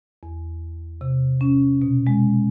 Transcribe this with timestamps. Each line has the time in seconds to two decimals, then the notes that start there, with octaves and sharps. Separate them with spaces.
0.23 E2
1.01 C3
1.41 C#4
1.82 B2
2.07 G#3